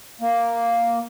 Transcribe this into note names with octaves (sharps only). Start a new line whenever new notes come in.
A#3